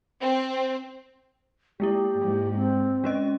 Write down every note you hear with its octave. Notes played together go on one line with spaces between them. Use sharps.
C4
G#3 A#3 E4 G4
G#2
C4
G#3 C#4 D#5